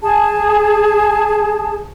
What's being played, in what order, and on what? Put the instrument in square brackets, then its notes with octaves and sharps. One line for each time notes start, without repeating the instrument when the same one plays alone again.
[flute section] G#4 A5